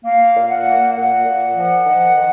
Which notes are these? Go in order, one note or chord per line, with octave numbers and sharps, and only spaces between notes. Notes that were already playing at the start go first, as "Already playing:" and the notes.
A#3 F5
A#2
F#5
A#3
A#2 F#5
A#2
F3
D#3
D#3